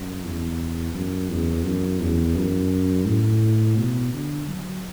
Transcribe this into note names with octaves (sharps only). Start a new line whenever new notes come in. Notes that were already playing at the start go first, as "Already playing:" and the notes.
Already playing: F#2
E2
F#2
E2
F#2
E2
F#2
A2
B2
D3
F#3